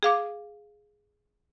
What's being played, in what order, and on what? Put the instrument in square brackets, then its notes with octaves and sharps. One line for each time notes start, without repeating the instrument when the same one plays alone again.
[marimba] G#4 F5 D6